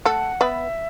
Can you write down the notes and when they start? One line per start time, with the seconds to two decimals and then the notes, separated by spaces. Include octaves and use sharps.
0.05 A3 A4 F#5
0.41 B3 B4 E5